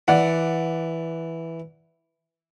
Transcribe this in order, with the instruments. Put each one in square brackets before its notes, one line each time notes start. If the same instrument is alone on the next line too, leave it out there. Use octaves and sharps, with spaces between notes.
[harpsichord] E3 [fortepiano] D5 F#5